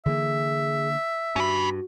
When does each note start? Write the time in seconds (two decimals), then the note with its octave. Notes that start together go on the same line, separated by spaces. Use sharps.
0.06 D3 E3 A#3 G#4 E5
1.36 G2 C#4 F#4 B5